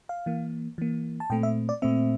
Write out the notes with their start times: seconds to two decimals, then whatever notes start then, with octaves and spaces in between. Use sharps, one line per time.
0.09 F5
0.26 E3 A#3
0.78 E3 A#3
1.20 A5
1.30 A#2 A3 C4 G5
1.43 E5
1.69 D5
1.82 A#2 A3 C4 E5